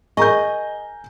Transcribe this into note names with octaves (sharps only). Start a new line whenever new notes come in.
G#4 A#4 D#5 G#5 A#5 C#6 G6